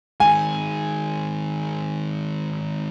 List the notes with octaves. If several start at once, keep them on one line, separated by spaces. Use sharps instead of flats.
D#3 G#3 G#5